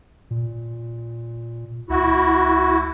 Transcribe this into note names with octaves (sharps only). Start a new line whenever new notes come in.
A#2
C#2 E4 F#4